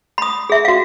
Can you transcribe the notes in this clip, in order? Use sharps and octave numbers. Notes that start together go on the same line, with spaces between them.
B5 D#6
G#4 E5
F#4 F5